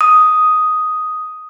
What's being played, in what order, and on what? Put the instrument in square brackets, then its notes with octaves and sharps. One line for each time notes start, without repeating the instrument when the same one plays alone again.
[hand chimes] D#6